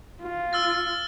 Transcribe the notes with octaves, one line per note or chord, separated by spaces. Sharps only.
F4
E6 F6 A6